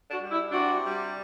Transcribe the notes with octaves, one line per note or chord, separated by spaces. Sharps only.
D4 F#4
G3
E4
C3 D4 F#4
G3